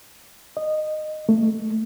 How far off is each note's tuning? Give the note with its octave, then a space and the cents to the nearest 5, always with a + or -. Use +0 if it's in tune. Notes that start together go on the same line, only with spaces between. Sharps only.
D#5 -15
A3 +20